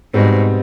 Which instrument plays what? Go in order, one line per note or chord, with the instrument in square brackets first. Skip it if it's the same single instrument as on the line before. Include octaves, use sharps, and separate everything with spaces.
[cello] G#2 [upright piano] B2 G3 C4 D#4